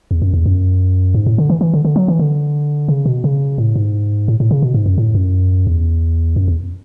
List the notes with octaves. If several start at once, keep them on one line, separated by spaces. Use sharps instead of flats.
E2
F#2
E2
F#2
G#2
A2
D3
E3
E3
D3
D3
F#3
E3
D3
C#3
B2
C#3
A2
G#2
A2
A2
C#3
B2
G#2
F#2
A2
F#2
E2
F#2
E2